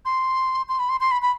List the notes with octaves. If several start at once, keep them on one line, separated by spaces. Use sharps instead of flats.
C6
C6
B5
C6
C6
B5
B5